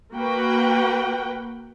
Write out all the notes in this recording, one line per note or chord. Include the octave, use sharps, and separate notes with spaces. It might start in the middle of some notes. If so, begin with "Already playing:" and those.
A#3 F#4 B4 F#5 G5